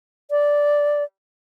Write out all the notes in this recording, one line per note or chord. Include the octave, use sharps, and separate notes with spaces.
D5